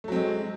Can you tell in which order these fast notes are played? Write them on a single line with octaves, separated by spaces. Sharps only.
A3 F#3 C4 G#3